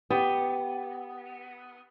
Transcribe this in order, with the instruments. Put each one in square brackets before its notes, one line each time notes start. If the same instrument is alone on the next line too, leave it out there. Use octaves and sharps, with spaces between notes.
[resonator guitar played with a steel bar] B3 [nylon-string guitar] G4